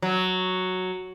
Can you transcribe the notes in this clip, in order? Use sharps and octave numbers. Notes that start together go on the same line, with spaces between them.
F#3